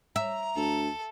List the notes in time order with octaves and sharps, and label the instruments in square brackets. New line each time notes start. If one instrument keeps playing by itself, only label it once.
[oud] E5 [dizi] A#5
[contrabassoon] D2 [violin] A4